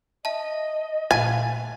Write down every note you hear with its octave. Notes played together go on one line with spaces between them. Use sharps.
D#5 E5 A5
A#2 A3 F5 G#5 A5 A6